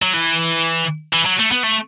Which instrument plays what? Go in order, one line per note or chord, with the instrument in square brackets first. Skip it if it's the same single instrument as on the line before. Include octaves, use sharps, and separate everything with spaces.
[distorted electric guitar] F#3
E3
E3
F#3
A3
B3
A3